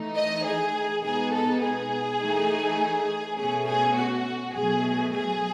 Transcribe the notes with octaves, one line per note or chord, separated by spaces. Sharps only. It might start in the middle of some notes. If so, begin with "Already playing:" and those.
Already playing: E3 A3 D#4
D#5
G#4
B2 G#3 B3 D#4 G#4
A4
G#4
E3 A3 D#4
B2 A3 C#4 G#4
G#4
F#4
B2 F#3 A3 G#4
G#4